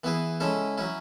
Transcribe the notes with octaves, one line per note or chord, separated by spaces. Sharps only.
E3 B3 E4 G#4
C#3 G#3 C#4 E4 A4
F#3 C#4 E4